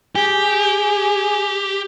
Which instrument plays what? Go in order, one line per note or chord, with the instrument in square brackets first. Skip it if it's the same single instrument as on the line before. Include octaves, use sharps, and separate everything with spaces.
[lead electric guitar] G4 [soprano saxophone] G#4